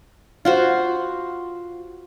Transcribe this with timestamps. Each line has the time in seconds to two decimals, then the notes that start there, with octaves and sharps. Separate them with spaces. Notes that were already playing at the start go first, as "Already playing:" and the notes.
0.45 F4 F#4 C5